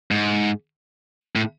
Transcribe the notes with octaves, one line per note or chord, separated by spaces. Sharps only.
G#2
A2